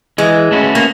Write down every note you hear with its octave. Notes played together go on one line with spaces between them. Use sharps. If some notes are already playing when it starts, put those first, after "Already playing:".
E3 G#3
A3 C#4 F#4 B4
A#3